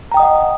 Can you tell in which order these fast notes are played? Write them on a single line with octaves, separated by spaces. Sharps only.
A#5 G5 D#6 D#5 F#5